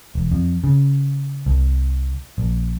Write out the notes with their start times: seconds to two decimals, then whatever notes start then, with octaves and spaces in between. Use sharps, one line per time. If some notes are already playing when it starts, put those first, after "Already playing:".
0.15 E1
0.32 F2
0.64 C#3
1.46 C2
2.38 A#1